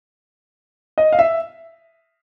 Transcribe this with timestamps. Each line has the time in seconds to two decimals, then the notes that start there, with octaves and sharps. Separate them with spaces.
0.98 D#5
1.12 F5
1.19 E5